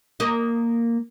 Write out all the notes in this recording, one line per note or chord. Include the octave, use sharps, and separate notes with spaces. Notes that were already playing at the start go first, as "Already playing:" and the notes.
A#3 D#5